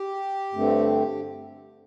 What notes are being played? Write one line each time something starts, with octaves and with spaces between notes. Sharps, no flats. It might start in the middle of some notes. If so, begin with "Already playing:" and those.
Already playing: G4
G2 D3 A3 C4